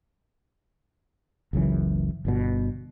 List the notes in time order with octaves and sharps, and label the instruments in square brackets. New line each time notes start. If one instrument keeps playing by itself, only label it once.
[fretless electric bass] F#1 C#2 F#2 E3
G1 G2 B2